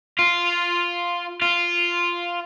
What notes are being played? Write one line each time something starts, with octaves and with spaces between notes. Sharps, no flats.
F4
F4